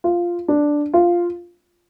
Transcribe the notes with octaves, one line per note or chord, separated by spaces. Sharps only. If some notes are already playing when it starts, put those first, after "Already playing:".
F4
D4
F4